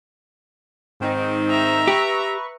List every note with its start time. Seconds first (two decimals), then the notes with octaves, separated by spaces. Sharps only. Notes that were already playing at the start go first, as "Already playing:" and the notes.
1.00 G#2 D#3 C4 D#4
1.49 E5 A#5
1.88 G4 B4 C#6